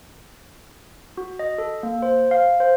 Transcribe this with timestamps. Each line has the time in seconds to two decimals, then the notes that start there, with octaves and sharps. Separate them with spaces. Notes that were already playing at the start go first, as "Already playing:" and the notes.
1.17 F#4
1.39 D#5
1.58 A4
1.83 A#3
2.02 C5
2.31 F5
2.60 C5